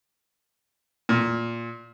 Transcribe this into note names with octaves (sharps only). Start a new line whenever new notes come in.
A#2